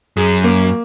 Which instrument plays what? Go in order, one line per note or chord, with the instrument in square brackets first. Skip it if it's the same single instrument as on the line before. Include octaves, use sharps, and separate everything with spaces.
[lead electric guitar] F#2 [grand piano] G#4
[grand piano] A#3